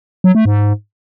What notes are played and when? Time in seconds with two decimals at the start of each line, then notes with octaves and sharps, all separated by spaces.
0.24 F#3
0.35 A3
0.45 G#2